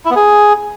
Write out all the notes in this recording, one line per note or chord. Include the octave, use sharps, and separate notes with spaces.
E4
B3
G#4